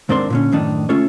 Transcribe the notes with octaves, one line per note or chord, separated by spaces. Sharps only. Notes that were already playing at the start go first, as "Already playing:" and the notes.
D#2 G#2 C4 D4 A#4 C6
A#2 D3 C#4
F#2 A2 D#3 D4 D#4
C#2 A3 C#4 F4 A4 C#5